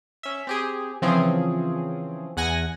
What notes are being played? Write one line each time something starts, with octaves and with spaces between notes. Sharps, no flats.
C#4 E5
C4 G4 G#4
C#3 E3 F3 C4 C#4 G#4
E2 F#5 G#5 A#6